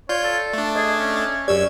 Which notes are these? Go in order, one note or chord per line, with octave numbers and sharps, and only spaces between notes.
F4 C#5 D5 G6
A4
A3 D4
G#4 D#5
C#4
F#2 G4 D5 E6 G#6